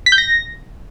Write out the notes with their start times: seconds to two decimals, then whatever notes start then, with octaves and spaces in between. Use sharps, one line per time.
0.06 B6
0.12 G6
0.18 A#6